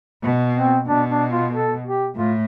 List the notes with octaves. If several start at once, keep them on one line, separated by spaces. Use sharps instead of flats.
B2
C4
B2 D4
D4
F4
A4
G4
A2 F4